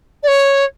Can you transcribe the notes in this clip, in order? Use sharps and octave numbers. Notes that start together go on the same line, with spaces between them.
D5
C#5